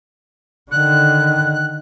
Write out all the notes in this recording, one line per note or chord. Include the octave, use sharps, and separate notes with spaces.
D3 D#3 F#6